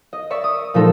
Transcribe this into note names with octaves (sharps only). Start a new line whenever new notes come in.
D#5
D5 E5 C#6
D#6
A#2 F3 G#3 A3 D#4 A4